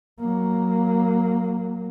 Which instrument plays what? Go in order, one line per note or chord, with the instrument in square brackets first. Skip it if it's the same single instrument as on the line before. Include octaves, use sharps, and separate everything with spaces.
[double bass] F#3 A#3